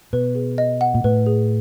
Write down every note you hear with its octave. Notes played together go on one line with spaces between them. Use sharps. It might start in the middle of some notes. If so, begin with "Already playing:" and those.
B2 B4
G#4
D#5
F#5
A#2
A2 B4
G#4